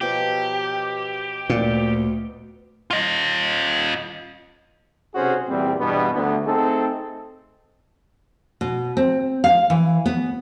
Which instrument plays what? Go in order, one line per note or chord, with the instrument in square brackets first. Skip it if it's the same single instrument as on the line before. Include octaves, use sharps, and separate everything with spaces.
[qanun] B2 F3 F#3 [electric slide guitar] G4
[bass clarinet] D2 [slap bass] A#2
[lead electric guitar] F4 D#5
[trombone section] B1 C3 C#4 F#4 G#4 C5
E2 A#2 G3 C4
E2 G2 B2 G3 B3 D4
D2 B3
A3 C4 D#4 G#4 A4
[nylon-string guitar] B2
C4
F5
E3
B3